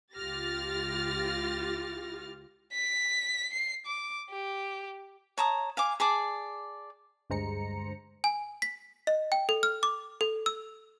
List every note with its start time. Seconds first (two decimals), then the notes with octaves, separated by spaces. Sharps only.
0.15 C#2 F4 G4 F6 A6 A#6
2.72 B6
3.53 C7
3.86 D6
4.30 G4
5.38 C#5 A5 A#5 D#6
5.77 F5 G#5 D6
6.00 G#4 D5 A5 D6
7.30 D2 G2 G#3 C5 A#5 C#7
8.24 G#5
8.62 B6
9.07 D#5
9.32 G5
9.49 A4
9.63 F6
9.83 D6
10.21 A4
10.46 E6